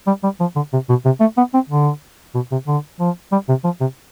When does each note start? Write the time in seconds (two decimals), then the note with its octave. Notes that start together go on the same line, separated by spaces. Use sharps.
0.07 G3
0.23 G3
0.40 F3
0.56 D3
0.73 C3
0.89 B2
1.05 C3
1.20 A3
1.37 B3
1.54 C4
1.69 D3
2.35 B2
2.51 C3
2.67 D3
3.00 F3
3.32 G3
3.49 C3
3.64 F3
3.80 C3